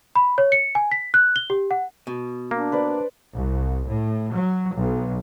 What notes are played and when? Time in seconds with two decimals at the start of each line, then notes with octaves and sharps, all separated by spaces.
0.15 B5
0.38 C#5
0.52 C#7
0.75 G#5
0.92 B6
1.14 F#6
1.36 G7
1.50 G4
1.71 F#5
2.07 B2
2.51 A#3 D4
2.72 B4 C5 D5
3.35 C2
3.88 A2
4.34 F#3
4.75 B1